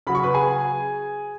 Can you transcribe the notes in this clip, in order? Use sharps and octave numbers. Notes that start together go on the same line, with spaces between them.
C#3 F#3 B5
C#6
B4 B5
G#4 G#5